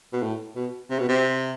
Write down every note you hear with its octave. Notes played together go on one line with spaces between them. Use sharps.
B2
A2
B2
C3
B2
C3